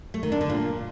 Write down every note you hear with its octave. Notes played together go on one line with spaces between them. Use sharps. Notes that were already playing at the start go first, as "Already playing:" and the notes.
A3
D#3
D4
D3
A#2